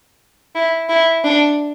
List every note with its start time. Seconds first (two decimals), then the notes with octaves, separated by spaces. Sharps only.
0.55 E4
0.89 E4
1.24 D4